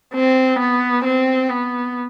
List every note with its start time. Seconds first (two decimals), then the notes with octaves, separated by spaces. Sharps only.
0.15 C4
0.60 B3
1.05 C4
1.49 B3